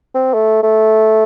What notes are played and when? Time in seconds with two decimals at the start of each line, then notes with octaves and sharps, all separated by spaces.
0.14 C4
0.34 A3
0.63 A3